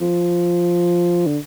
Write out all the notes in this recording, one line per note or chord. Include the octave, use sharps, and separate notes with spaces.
F3
D3